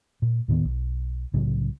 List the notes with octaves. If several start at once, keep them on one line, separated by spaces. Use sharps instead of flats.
A#2
D#2 A2 D#3 B3
B1
C2 A2 C#3 F#3